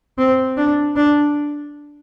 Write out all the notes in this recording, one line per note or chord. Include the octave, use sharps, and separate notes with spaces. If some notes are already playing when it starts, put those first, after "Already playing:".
C4
D4
D4